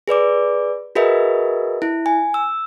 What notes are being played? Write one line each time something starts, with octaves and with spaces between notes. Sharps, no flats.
G#4 B4 D5 D6
F#4 G#4 A#4 B4 D#5 E5
E4
G#5
E6